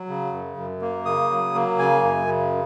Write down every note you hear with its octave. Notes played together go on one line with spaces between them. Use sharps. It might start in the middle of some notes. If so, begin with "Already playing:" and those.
Already playing: F#3
C#3
F#2
F#2
A#3
C#3 D#6
F#3
A#3
C#3 G#5
F#2
C#3